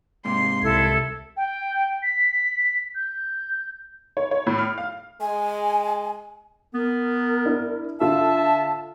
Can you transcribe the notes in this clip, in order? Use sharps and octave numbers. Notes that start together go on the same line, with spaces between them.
G#2 C3 A#3 C6
C2 E4 A4 G#6
G5
B6
G6
C#5
C#5
A2
F6
F5
G#3 G#5
B3 A#4
D4 E4
D3 F4 A4 E5 A5